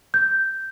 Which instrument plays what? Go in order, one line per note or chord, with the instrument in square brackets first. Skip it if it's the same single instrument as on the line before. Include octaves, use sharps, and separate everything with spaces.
[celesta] G6